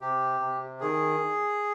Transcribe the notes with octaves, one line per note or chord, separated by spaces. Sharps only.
C3 G4
C3
D#3 G#4